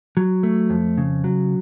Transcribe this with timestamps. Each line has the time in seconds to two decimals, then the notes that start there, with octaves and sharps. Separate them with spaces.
0.17 F#3
0.43 A3
0.70 F2
0.97 C#3
1.24 F#3